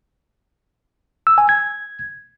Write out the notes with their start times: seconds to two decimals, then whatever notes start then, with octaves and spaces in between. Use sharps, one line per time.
1.27 E6
1.38 G#5
1.49 G#6